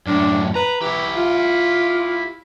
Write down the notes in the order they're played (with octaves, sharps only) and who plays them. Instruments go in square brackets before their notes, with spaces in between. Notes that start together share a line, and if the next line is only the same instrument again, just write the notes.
[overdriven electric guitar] F#2 A2 [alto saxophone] D4
[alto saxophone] B4 [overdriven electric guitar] A#5
[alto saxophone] E3 [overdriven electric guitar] E4 G4
[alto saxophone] F4